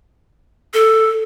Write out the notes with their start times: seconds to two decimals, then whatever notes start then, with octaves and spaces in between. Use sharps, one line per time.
0.74 A4